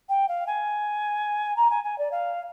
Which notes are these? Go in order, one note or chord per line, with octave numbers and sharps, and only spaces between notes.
G5
F5
G#5
A#5
G#5
G#5
D5
F5